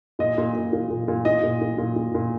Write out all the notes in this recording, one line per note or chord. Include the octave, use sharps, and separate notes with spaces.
A#2 D#5
A#2
A#2
A#2
A#2
A#2
A#2 D#5
A#2
A#2
A#2
A#2
A#2